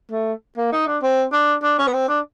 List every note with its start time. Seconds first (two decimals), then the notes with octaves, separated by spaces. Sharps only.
0.11 A3
0.57 A#3
0.72 D#4
0.87 D4
1.02 C4
1.32 D4
1.63 D4
1.78 C#4
1.87 B3
1.93 C4
2.08 D4